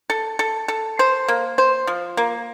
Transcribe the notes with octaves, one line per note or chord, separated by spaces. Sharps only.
A4
A4
A4
C5
A#3
C5
F3
A#3